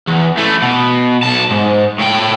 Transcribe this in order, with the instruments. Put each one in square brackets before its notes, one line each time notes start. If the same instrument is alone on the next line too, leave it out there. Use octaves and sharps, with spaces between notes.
[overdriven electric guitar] E2
E3 A3
B2
B1 A5
G#2
A2 G5